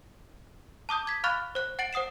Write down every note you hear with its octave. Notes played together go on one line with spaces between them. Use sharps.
A5 D6 D#6 G6
G#6 B6
F5 B5 C#6 F6 F#6 A6
C5 F#6
F#5 A6 D7 F#7
C5 F#5 D#6 C7 E7